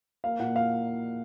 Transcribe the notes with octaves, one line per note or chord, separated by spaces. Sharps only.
A#3 F5
A#2 F#5
F5